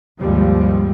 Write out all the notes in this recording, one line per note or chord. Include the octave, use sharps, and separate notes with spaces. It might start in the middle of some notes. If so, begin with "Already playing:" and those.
G#1 D#2 F3 G3 G#3